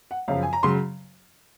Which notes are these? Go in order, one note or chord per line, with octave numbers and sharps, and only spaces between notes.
F#5
F#2 C#3 F3 F5
G#5
A#5
C#3 F#3 C6